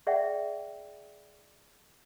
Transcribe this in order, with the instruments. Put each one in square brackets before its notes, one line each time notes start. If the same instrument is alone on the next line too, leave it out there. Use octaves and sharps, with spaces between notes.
[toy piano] G#4 D5 E5 F#5 G5